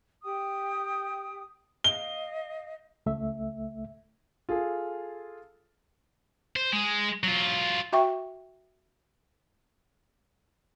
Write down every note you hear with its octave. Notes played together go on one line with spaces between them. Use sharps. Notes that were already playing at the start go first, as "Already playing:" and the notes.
G4 G5 D#6
D#5 F5 G7
C#2 A3 E5
F4 G#4 A4
C5
G#3
F#3 F4
F#4 E5 G5 C#6